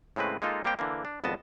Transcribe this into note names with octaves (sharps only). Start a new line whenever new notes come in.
A2 C#3 G#3 C4 B4
G#3 A#3 D#4 F4 A4
G3 A#3 C4 G4 G5
D3 E3 A#3
D4
G#1 F2 B3 D#5 A5